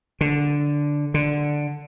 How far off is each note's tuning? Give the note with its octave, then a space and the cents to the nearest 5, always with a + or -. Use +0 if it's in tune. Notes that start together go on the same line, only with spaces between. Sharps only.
D3 -5
D3 +5